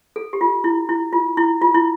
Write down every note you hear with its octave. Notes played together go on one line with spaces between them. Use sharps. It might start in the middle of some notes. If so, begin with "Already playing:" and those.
A4
G4
F4
E4
E4
F4
E4
F4
E4